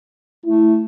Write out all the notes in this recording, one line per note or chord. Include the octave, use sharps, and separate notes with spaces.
A3 E4